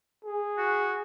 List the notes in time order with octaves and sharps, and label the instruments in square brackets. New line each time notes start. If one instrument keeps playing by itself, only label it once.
[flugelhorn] G#4
[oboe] F#4